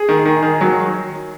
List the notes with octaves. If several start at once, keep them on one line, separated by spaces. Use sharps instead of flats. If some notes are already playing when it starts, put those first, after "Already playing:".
Already playing: G#4
D#3
D#3
D#3
F#3